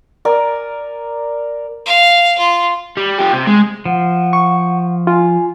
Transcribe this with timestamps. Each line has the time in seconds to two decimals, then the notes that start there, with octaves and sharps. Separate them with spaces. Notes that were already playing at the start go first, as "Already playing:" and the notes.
0.25 A#4 D5 G#5
1.86 F5
2.38 F4
2.97 G3
3.19 F4 G4
3.33 C3
3.47 G#3
3.86 F3 F#5
4.33 C#6
5.07 F4 G#5